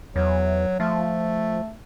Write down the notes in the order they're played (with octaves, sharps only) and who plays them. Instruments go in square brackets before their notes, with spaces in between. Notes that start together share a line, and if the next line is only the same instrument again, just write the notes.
[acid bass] E2 [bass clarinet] F#3
[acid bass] F3 [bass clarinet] A3